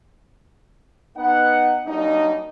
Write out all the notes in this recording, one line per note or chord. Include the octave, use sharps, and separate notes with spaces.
B3 D#4 F#5
F#3 G3 A#3 D4 D#4